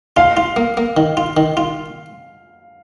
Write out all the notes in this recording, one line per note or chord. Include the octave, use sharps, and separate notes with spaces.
F4 F5
F4
A#3
A#3
D#3
F4
D#3
F4